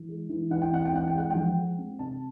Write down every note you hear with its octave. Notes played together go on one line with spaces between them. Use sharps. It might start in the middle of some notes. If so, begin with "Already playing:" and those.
Already playing: E3
G#3
E3
E3 F#5
G5
C4 F#5
G5
E3 F#5
G5
G#3 F#5
F3 G5
F#5
G#3
C4
C3 A5